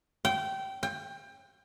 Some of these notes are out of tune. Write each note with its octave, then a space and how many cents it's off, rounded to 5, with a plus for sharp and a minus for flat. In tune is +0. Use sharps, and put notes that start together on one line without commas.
G5 -20
G5 +25